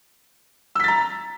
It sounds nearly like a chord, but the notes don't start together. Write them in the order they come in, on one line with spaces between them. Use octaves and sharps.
E6 B6 A6 A#5